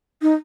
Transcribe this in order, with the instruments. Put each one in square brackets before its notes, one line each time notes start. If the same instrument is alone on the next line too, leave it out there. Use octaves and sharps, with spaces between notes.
[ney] D#4